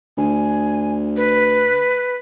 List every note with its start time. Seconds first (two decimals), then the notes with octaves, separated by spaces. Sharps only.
0.18 D2 G#5
1.17 B4